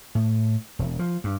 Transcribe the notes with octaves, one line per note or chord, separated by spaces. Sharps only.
A2
E1
F3
G2